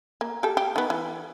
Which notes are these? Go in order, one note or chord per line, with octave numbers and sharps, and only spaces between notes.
A#3
G4 A4
G4
D#3 B3
E3